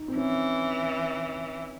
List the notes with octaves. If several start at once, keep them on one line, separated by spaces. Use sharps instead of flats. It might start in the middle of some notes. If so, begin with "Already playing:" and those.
Already playing: D#4
C4
E3 C#4